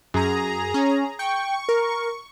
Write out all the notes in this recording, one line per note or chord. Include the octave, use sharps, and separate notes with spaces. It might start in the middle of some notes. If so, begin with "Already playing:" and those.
F#2 G#4 A#5
C#4
G5 C#6
A#4